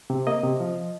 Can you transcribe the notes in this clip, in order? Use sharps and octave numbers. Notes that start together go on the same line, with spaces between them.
C3
A#3 D#5
C3
F3